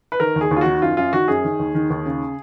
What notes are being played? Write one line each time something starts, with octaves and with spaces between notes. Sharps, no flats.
B4
D#3 A#4
D#2
G#4
D#2
F4
D#3 F#4
F#2 F4
F#2 F4
D#3 F#4
F#2 G#4
D#3
D#2
D#3
D#2
C#3